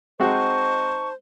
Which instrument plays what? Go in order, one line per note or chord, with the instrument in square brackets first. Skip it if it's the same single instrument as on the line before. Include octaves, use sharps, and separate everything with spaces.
[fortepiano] G#3 C4 F#4 [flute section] D#4 A5 C#6 [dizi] C5